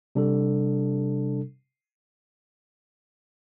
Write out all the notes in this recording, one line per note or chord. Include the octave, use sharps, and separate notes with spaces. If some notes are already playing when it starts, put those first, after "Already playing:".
C3 G3 D4 A4